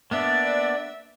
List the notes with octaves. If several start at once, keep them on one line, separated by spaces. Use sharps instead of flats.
A#3 B3 D4 D5 E5